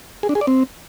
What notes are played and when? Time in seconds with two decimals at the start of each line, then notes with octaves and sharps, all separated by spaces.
0.23 G#4
0.29 D4
0.35 G#4
0.41 D5
0.47 C4